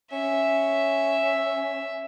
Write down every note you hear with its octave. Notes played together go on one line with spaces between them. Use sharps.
C#4 E5